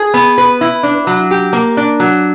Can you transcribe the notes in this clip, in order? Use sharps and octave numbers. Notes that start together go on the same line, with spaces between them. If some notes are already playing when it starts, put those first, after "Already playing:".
Already playing: G#4
B3
B4
E4
D4
F#3
G4
A#3
D4
F#3